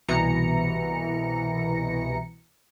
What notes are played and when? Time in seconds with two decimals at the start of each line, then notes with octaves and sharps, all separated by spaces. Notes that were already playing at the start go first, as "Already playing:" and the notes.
0.08 C2 B2 E3 A#5 C#7